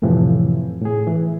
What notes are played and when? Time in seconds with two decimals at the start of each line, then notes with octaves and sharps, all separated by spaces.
0.02 F2 A2 C3 E3 F3
0.81 A2 G#4
1.07 E3